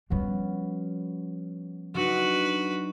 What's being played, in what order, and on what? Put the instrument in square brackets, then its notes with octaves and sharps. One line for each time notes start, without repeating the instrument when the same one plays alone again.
[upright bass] F3 G3 [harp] B3 C#4 F#4
[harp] F#3 D4 D#4 [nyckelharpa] F#4 B4